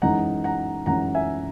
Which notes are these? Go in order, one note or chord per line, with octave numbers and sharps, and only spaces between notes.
F#2 E3 G#3 D#4 F#5 A#5
F#5 A#5
F#2 E3 G#3 D#4 F#5 A#5
E5 G#5